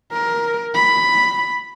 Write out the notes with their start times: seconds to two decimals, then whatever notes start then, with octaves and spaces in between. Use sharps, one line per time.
0.13 A#4
0.75 B5